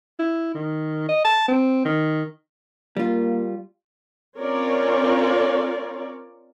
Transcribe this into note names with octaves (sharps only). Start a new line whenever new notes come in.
E4
D#3
D#5
A5
C4
D#3
G3 A#3 F4
C4 C#4 F4 A#4 C#5 D5